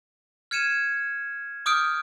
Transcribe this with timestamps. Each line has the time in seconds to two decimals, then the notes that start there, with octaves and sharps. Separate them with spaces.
0.51 F6 G#6 C#7 D#7 E7
1.66 D6 D#6 F6 G6 D7